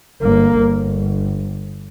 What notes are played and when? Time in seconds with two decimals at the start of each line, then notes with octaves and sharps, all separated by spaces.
0.22 G1 A#3
0.58 G1